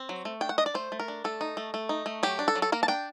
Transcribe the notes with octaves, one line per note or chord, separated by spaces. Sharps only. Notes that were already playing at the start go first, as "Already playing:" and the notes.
Already playing: C4
F#3
A3
D4 G5
F#5
D4 D#5
D5
A3 C5
A3
A#4
D4
A3 A4
D#4
A3
A3
D#4
A3
F#3 G4
D4
A4
F#3
A4
A#3 A#4
A5
D4 G5